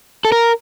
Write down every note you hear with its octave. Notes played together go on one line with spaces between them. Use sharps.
A4
A#4